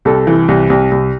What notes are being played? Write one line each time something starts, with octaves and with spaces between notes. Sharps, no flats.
C2 A4
E3
C2
C2
C2